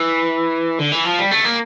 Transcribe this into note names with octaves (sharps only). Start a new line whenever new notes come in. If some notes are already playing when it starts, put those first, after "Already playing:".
Already playing: E3
D3
E3
F3
G3
A3
A#3